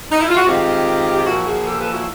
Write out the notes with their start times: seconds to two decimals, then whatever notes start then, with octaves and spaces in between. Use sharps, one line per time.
0.11 D#4
0.20 E4
0.29 F4
0.37 F#4
0.46 D#3 G#3 C4 F4 G4
1.17 G4
1.27 A#2 F3 A#3 E4 F#4
1.46 F#4 G#4
1.67 G4 A4
1.80 A4 B4
1.94 E4 F#4